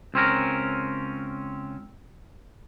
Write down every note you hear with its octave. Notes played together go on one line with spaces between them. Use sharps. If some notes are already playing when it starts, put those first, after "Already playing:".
C#2 C4 C#4 A#4